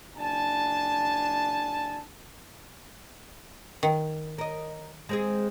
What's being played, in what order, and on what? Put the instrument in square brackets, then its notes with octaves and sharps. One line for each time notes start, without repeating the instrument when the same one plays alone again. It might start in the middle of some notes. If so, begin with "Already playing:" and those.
[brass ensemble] F#1 D4 G#5 A5
[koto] D#3
[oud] A#4 D#5
G#3 C4 G#4